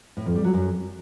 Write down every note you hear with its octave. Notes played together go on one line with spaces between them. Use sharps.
A2
F2
G3
F#3
F#2